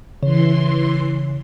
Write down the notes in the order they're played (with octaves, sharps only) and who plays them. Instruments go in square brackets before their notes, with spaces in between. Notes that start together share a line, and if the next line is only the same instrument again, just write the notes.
[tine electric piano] C#3 C#5 [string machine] E3 C6